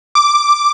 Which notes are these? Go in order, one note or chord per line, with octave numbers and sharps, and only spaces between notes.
D6